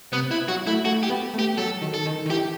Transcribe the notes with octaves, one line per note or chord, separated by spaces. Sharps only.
C3 B3
E4
F#3 F#4
A3 E4
A3 F#4
G4
B3
A3
G4
F#3 A4
D#3
A4
D#3
D#3
E3 G4